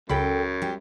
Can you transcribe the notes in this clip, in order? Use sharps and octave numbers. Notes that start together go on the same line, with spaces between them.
C#2 F#2 C#3 A4 G5 B5
G3 G4